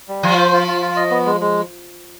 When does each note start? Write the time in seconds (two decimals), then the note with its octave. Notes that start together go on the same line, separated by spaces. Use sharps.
0.09 G3
0.23 F3 F4
0.38 C5
0.53 F4
0.67 F4
0.82 F4
0.96 D#5
1.11 B3
1.26 G#3
1.41 G#3